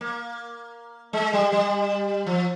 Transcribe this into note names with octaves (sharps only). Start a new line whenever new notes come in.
A#3
G#3
G3
G3
F3